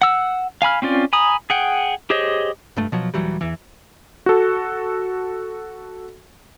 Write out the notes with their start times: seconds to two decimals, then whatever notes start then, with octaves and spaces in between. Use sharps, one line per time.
0.02 F#5 E6
0.62 F5 G#5 B5 F6
0.82 C4 C#4 F4 D5
1.13 G#5 A#5 B5 D#6
1.50 G#4 F#5 G5
2.10 G4 G#4 C5 C#5 D#5
2.76 F1 G2 A3
2.92 B2 F3 F#3
3.14 D#1 E3 F#3 G3
3.41 E2 E3
4.26 F#4 A4